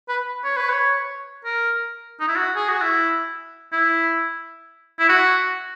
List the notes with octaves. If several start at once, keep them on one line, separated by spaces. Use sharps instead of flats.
B4
C#5
B4
C#5
A#4
D#4
E4
F#4
G#4
F#4
E4
E4
E4
F#4